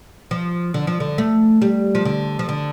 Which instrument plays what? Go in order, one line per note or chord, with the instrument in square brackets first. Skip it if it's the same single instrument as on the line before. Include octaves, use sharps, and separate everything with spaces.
[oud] F3
D3
F3
D3
A3
G3
F3
D3
F3
D3